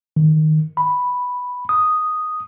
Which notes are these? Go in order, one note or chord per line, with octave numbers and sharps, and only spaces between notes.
D#3
B5
D#6